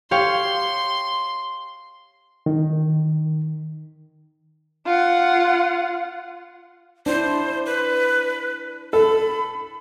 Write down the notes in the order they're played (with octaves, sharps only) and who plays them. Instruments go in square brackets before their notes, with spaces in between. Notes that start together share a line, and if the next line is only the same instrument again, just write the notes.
[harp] G4 C#5 F5 [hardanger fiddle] C6
[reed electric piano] D#3
[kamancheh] F4 F#5
[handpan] D4 E4 [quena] C5
[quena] B4
[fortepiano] A4 [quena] B5